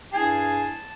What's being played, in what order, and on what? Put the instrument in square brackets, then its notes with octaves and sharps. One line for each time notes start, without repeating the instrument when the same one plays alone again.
[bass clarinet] G2 [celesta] E4 G#6 C7 [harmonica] G#4 [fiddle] A5